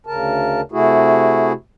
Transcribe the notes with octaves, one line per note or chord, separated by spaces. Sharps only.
D2 C#3 A#4 A5
C3 A3 E4 F#4 G#4